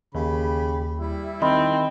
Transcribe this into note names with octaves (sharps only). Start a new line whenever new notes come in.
D#2 C#3 G4 B5
G3 E4
D#3 C4 D#5 B5 C6